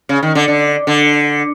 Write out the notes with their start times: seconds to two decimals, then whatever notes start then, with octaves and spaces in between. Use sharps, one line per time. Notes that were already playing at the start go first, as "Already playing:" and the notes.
0.09 C#3
0.23 D#3
0.35 D3
0.48 D3
0.87 D3